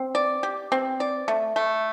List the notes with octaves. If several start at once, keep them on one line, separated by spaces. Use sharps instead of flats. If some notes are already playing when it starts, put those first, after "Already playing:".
Already playing: C4
D5
G4
C4
D5
A3
A3